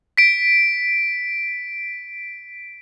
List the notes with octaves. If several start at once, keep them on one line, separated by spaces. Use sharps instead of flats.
B6 D7